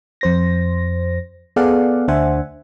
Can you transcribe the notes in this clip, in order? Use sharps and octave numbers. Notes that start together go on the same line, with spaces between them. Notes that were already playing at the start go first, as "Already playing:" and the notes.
F2 C5 A#6
B3 G#4 A4 D5 F5 F#5
D2 D4 C5 E5 F#5 G#5